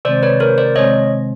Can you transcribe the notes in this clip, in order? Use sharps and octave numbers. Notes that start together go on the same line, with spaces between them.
C3 D#3 G#3 C4 C5 D5
B4 C#5
A#4 C5
C5 D5
C3 D#3 G#3 C4 C#5 D#5